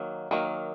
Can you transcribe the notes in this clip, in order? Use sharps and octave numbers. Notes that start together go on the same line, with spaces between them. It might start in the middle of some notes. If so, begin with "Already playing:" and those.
Already playing: D#3 F#3 A#3
D#3 F#3 A#3